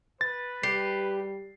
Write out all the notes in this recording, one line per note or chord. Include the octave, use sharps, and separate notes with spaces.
B4 A6
G3 G4 C7